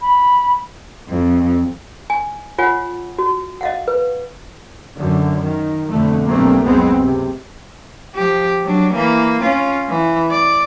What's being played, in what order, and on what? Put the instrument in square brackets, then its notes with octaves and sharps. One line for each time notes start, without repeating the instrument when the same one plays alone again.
[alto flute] B5
[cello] F2
[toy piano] G#5
F4 C#5 F#5 G#5
F#4
D#5 F5 F#5
B4
[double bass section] F#2 D3
D#3
F2 B2 D3 A3
B1 G2 A3 A#3 C4
F#1 C#2 F3 G#3 B3 C4
C3
[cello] F3 G4
F#3 D4
E3 A#3
C#4 F4
E3
D5